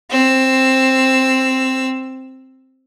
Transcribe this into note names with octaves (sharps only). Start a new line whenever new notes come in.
C4 E6